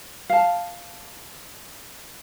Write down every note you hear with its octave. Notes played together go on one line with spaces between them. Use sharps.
F5 A5